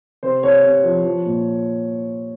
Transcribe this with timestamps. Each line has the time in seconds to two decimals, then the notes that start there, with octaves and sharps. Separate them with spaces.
0.23 C3 C5
0.43 C3 C#5
0.64 C3
0.84 F3
1.05 F3
1.26 A#2